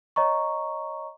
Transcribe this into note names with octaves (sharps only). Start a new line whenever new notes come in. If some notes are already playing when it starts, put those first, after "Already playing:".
C#5 D#5 A#5 C#6